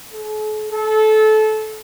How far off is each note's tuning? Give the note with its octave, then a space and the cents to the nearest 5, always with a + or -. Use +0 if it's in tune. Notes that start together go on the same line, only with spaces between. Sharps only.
A4 -45
A4 -25